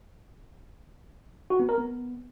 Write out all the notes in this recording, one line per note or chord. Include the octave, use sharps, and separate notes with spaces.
F#4
B3
A#4
B3